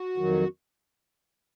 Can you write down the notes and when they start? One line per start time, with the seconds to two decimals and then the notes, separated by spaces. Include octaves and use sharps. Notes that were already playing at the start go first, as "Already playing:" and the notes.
Already playing: F#4
0.17 F2 D#3 F#3